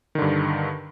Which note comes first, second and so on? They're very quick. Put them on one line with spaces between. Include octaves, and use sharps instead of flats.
D#3 D3 G2